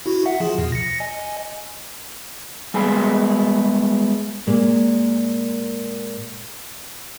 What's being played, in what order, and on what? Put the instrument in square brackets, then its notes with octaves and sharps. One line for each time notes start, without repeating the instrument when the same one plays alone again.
[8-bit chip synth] E4 F#4
E5 F#5
F3 F4 G#4
E2 B2
A#6 C#7
D#5 G#5
[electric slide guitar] G3 G#3 B3 G#4 G#5
[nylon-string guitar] A#2 G#3 A#3